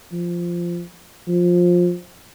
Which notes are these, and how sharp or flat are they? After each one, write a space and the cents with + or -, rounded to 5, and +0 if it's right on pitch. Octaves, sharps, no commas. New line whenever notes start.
F3 -10
F3 +15